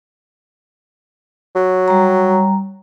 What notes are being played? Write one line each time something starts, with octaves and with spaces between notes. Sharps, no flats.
F#3
G3 A#5